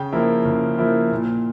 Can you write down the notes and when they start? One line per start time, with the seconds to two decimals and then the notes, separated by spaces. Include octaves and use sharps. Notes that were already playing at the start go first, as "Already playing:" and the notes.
Already playing: C#3 G5
0.13 F3 A#3 E4
0.45 C#3
0.78 F3 A#3 E4
1.12 A#2